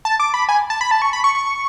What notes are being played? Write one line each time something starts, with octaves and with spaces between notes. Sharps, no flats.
A5
D6
B5
G#5
A5
B5
A5
C#6
B5
C#6
C#6